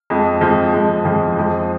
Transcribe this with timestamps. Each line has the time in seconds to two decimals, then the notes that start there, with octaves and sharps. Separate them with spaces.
0.10 F2 F3 G#3
0.41 F2 F3 G#3
0.73 F2 F3 G#3
1.05 F2 F3 G#3
1.37 F2 F3 G#3